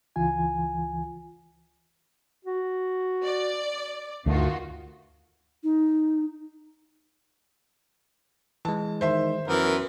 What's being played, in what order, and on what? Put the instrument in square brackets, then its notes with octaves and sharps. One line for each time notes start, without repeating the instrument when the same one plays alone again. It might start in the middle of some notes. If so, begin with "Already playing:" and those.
[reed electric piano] C#2 E3 F4 G#5
[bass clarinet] F#4
[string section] D5
[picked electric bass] D2 A3 [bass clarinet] G2 [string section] D#3 F4 F#4
[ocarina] D#4
[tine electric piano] E3 G#3 [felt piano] A5
[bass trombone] D#3 [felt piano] C5 E5 C6
[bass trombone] F#2 [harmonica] E3 B3 A#4 [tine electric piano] B4